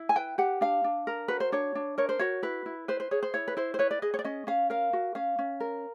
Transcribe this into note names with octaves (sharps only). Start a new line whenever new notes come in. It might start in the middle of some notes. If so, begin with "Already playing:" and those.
Already playing: E4
G#5
B4 G5
G4 F#5
D4 F5
D4
A#4
F#4 B4
C5
D4 C#5
D4
A#4 C#5
C5
F#4 C#5
E4 B4
E4
B4 C5
C5
G#4 C#5
C5
E4 C#5
B4
E4 C5
C5
B4 C#5
D5
G#4 D#5
C#5
D5
C#4 D#5
C#4 F5
A#4 F5
F#4
C#4 F5
C#4
A#4